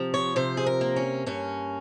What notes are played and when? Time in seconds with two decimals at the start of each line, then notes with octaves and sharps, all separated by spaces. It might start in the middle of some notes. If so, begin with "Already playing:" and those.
Already playing: C3 F3
0.14 C#5
0.36 C3 C5
0.57 G#4
0.66 A#4
0.81 A#3
0.96 C#4
1.26 G2 C#4